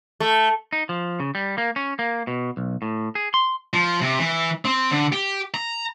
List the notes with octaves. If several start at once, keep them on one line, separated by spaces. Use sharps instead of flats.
A3
D#4
F3
C#3
G3
A#3
C#4
A#3
B2
B1
A2
G#4
C6
F3
C3
E3
C4
D3
G4
A#5